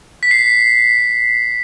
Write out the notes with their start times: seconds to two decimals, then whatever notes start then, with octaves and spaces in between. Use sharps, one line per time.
0.23 B6
0.31 C7